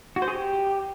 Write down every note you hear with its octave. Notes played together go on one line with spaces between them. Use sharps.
F#4
C5
G#4
G4